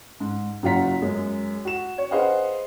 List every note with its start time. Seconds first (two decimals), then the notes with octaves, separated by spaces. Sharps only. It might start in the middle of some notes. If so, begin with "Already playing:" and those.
0.20 G#2
0.63 F#1 F#3 F4 F#5 A#5 B6
1.02 F#2 G#3
1.65 F#4 E7
1.98 C#5
2.11 G#4 B4 C5 D#5 F5 F#5